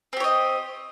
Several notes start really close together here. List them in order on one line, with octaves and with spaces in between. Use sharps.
C4 G4 C#5 D#5